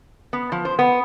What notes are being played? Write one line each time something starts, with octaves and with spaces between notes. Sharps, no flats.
B3
F3
C5
B3